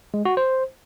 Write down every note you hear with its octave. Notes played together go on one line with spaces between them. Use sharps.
G#3
F#4
C5